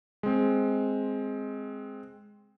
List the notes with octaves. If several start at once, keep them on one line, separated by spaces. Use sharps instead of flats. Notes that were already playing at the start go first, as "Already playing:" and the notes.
G#3 C4